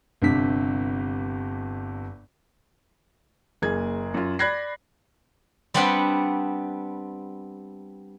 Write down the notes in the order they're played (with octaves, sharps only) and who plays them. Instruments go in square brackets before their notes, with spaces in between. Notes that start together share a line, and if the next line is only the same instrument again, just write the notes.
[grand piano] G1 G2 C3 B6
[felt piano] F#1 A#3 G#4 G#6
F#2 F4
D5 B5 F#6 G#6 A#6 C7
[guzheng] G3 B3 C4 D4 F#5 G5